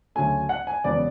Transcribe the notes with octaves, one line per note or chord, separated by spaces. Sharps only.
D2 C#3 F#3 A3 G#5
F#5
G#5
E1 E2 C#3 F#3 B3 D5